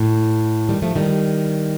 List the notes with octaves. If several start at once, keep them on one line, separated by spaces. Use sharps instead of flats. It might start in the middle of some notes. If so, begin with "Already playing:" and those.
Already playing: A2
D#3 G3
F3 A3
D#3 G3